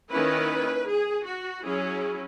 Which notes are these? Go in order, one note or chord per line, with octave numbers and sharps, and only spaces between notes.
D#3 A#3 C#4 E4 B4
G#4
F#4
F#3 C#4 E4 G#4